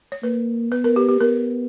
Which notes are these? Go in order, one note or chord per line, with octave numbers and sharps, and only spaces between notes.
C#5
A#3 B4
B3 B4
A#4
G4
G4
B3 A#4